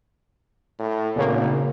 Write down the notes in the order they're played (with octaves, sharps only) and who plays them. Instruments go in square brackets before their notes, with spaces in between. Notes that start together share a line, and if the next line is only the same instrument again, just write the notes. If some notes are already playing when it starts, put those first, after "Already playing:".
[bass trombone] A2
[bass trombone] G#1 [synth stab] A#2 C#3 A#3